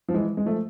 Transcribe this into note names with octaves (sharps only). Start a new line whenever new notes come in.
F3
E3 G#3
G#3
F3 A3